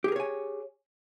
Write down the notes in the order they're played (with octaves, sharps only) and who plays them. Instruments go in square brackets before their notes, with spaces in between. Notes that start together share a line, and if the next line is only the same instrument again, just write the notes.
[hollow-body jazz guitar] G4
G#4
A#4
C#5
G#5